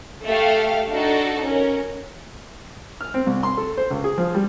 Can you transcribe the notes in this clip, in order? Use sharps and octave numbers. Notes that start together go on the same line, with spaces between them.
A3 G4 F5
D4 D#4 F#4 A4
C#4 A#4
F6
C4
C2
C6
A4
C5
C#2
G#4
F3
G3